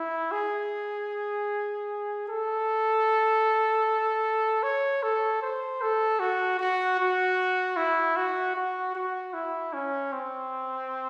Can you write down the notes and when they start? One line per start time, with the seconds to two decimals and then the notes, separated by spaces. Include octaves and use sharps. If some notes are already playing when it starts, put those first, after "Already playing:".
Already playing: E4
0.32 G#4
2.28 A4
4.63 C#5
5.03 A4
5.41 C5
5.82 A4
6.20 F#4
6.60 F#4
6.99 F#4
7.77 E4
8.17 F#4
8.56 F#4
8.95 F#4
9.34 E4
9.73 C#4
10.12 C4